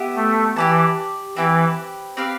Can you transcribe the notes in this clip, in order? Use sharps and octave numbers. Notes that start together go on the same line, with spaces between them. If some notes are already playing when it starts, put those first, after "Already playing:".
Already playing: B3 E4 G4
A3
E3 G4 D5 A5
E3 C4 G4 B4
C4 G4 B4 F5